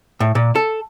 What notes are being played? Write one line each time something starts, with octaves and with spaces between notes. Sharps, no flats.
A2
A#2
A4